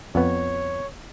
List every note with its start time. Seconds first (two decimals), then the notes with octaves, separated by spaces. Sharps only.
0.15 F2 B3 C#5